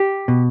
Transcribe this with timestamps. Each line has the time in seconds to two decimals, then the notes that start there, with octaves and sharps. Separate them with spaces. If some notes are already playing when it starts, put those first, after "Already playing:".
Already playing: G4
0.28 B2